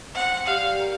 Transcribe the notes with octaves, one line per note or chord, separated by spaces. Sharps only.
C4 F#5
G3 F5
A#3